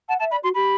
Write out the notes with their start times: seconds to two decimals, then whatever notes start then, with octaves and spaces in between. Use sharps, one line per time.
0.09 F#5 A5
0.19 E5 A5
0.31 D5 B5
0.43 F#4 C6
0.54 G4 B5